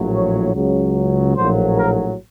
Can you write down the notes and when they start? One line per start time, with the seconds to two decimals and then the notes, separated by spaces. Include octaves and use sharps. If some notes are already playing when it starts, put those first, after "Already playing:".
Already playing: A#1 A2 F#3
0.13 C#5
0.53 C#2 C#3 F#3
1.35 A#1 A2 F#3 C5
1.76 A#4